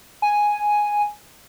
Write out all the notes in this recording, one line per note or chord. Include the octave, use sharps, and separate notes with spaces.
G#5